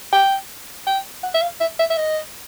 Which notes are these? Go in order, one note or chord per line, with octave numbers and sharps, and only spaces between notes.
G5
G5
F#5
E5
F5
E5
E5
E5
D#5